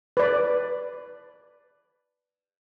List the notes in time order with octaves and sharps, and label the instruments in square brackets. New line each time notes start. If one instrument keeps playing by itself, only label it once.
[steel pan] B4 D5